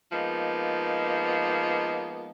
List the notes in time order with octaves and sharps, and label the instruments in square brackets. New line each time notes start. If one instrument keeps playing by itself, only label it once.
[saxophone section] F3 G#3 A#3 B3 D#4